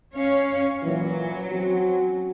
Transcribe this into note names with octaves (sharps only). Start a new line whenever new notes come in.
C#4 C#5 F5
A#2 E3 F#3
C4 C#4 F#4